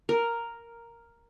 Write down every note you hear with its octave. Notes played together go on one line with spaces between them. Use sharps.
A#4